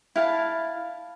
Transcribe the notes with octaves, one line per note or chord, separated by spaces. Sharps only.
E4 F5 G5 A5